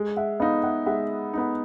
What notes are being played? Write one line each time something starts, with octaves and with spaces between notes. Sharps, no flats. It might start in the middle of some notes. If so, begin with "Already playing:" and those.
Already playing: G#3
E5 F#5
B3 D#4 D#5 F5
E5 F#5
G#3 E5 F#5
B3 D#4